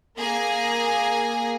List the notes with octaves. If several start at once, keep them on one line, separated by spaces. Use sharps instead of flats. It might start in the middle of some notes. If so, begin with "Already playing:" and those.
A#3 G#4 G#5 A#6